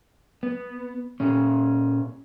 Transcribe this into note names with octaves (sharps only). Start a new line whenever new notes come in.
B3
A#2 C#4